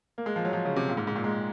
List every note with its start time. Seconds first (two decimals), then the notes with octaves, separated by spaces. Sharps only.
0.18 A#3
0.26 G#3
0.36 F3
0.45 F#3
0.53 F3
0.65 C#3
0.76 C3
0.89 A#2
0.97 G#2
1.07 G#2
1.16 A#2
1.24 G#3